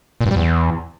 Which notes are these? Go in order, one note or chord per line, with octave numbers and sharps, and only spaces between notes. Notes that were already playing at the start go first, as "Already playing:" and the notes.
A#2
G2
G3
E2